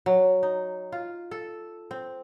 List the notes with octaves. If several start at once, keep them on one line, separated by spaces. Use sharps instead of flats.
F#3
D#4
F4
A4
C4